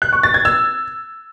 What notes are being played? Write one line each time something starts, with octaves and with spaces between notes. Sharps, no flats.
F#6
C#6
A6
G#6
E6